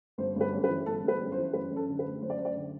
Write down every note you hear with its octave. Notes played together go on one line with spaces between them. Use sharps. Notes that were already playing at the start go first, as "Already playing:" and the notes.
G1 C5
G1 B4
F#2
B4
E3
G1 A4
G1 B4
F#2
C5
E3
F#2 B4
F#2
A4
D3
B4
A3
F#2 C5
D5
F#2 C5
D5
D3